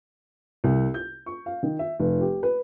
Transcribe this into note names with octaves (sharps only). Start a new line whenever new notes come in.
C2
G6
C#6
F5
D#3
E5
F1
G4
B4